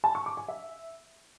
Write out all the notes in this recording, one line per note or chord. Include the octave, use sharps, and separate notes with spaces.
A5
C#6
D6
G#5
E5